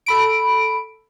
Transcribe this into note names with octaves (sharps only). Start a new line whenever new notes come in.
A4 B5 D7